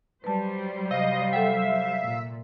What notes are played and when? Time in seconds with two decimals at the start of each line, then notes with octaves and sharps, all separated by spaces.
0.24 F#3 G3 B4 C5 A5
0.91 C3 D#5 F5
1.33 A4 E5 F#5 G5
2.04 A#2